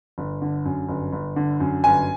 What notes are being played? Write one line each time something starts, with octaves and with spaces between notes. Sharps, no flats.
G1
D3
F#2
G1
G1
D3
F#2
G1 G#5